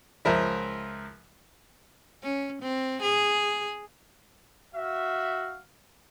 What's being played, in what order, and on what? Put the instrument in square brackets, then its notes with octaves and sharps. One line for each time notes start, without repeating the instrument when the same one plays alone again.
[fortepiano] C#2 F3 A#4 E5
[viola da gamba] C#4
C4
G#4
[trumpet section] F#4 E5 F5